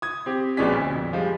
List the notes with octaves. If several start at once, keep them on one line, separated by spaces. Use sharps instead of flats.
D#6 G#6
C4 G4
A#1 B2 G#3 C#4 D5 B6
D2
F2
F3 G3 G#3